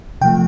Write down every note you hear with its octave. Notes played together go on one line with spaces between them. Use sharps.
C3 F3 A3 G5